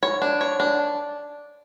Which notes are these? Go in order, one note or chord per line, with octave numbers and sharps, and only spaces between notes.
C#5
D4
C#5
D4